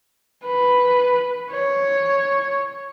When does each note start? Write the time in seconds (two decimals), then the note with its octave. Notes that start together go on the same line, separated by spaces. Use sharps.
0.45 B4
1.51 C#5